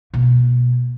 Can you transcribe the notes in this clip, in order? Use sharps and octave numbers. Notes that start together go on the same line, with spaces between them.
B2 A#3